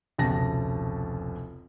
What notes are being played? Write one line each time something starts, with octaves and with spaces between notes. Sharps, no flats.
F1 C#2 B2 A5 A#6